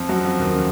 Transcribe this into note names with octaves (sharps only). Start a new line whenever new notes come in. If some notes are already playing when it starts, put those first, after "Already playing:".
Already playing: F2 F3
F#2 F#3
F2 F3
D#2 D#3
C#3